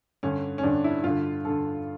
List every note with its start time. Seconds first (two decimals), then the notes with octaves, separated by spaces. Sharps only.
0.23 G2 D3 C#4
0.58 C#4
0.63 G2 D3 D4
0.84 E4
1.04 G2 D3 F4
1.45 G2 D3 A4